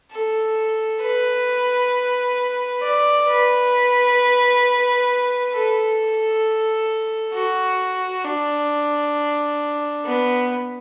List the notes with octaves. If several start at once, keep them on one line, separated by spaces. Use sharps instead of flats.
A4
B4
D5
B4
A4
F#4
D4
B3